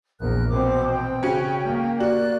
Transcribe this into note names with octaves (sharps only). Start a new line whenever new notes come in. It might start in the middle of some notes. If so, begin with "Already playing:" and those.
A#1 E2 A#4 F#6
B2 E3 C4 D6
G5
C#3 C#4 F#4
A#3
F#4 D5 F#6